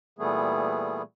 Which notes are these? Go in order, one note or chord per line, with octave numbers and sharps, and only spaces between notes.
A#2 E3 G3 A3 B3 G#4